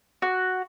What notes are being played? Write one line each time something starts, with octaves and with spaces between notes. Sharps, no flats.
F#4